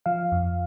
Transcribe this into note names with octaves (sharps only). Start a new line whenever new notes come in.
F3 F5
F2